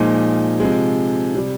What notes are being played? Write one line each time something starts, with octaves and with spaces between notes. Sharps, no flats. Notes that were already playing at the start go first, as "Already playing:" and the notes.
Already playing: A#2 F3 G#3 D#4
C3 F3 G#3
C3 G3